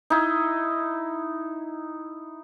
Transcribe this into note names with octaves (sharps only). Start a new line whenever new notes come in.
D#4 E4